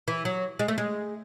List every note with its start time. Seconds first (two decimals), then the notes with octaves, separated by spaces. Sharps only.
0.08 E3
0.25 F#3
0.59 G#3
0.68 A3
0.78 G#3